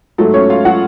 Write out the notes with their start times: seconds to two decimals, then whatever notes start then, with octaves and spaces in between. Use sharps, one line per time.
0.18 G#2 F#3 A3 A4
0.34 C#4 C#5
0.50 F4 F5
0.65 F#3 F#4 F#5